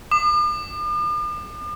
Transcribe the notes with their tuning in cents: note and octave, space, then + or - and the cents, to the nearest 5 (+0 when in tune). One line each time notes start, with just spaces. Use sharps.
D6 +45